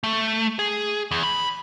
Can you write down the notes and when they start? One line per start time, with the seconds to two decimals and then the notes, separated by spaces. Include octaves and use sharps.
0.04 A3
0.59 G#4
1.11 E2
1.23 B5